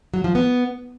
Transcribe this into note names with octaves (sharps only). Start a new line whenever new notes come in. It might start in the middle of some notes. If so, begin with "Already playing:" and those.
F#3
F3
B3